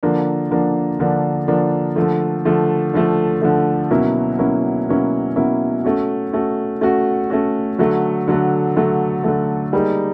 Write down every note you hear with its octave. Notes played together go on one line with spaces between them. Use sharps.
D3 F3 A#3 D4
D3 F3 A#3 D4
D3 F3 A#3 D4
D3 F3 A#3 D4
D3 F3 A3
D3 F3 A3
D3 F3 A3
D3 F3 A3
B2 F#3 A#3 C#4 E4
B2 F#3 A#3 C#4 E4
B2 F#3 A#3 C#4 E4
B2 F#3 A#3 C#4 E4
A3 C#4 F#4
A3 C#4 F#4
A3 C#4 F#4
A3 C#4 F#4
D3 F#3 A3
D3 F#3 A3
D3 F#3 A3
D3 F#3 A3
G3 A#3 D#4 G#4